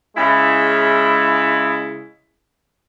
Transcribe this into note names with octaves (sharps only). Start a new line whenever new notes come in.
C#3 G#3 E4